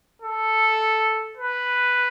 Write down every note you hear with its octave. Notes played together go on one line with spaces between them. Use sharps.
A4
B4